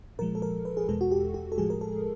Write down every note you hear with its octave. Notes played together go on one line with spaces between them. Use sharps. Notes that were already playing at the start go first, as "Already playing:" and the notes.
A#2 F3 G#3 A#4
A4
A#4
B4
G#4
E2 B2 G#3 A4
F#4
G4
G4
A4
A2 F3 G#3 G#4
A#4
A4